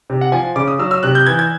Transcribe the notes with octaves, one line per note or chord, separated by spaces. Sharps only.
C3
F#5
F3 G#5
C#3 D6
D#6
F#3 E6
E6
C3 F#6
G6
E3 G#6
G#6